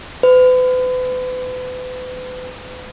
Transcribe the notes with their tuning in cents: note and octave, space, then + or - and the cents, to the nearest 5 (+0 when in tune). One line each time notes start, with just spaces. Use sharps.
B4 +40